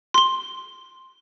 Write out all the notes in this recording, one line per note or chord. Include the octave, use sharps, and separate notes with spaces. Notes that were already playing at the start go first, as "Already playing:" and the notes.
C6 G7